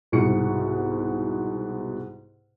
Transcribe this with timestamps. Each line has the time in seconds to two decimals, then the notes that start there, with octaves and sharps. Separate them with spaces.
0.12 C2 G#2 B2 C#6 C#7